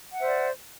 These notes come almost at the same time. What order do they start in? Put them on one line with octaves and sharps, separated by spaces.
F#5 E5 C5 D5